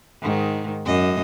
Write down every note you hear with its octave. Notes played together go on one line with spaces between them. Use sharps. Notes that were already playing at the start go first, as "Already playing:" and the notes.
G#2 D#3
F#2 D#5